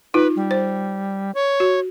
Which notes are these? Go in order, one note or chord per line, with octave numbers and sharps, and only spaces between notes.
D#4 F4 B4
G3
C5
C#5
F#4